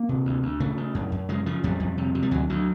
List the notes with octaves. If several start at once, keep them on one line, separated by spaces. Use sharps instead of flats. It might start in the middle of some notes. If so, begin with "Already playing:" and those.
Already playing: A#3
C3
D2
D2
C#3 A3
C#3
F#2
F#2
C#3 G#3
C#3 F3
F2 G3
F2
C3
C3
G3
D2 F#3
D2 F#3